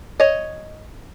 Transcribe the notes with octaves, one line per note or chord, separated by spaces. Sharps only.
C#5 D#5